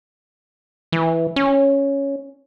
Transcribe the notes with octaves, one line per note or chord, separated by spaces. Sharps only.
E3
C#4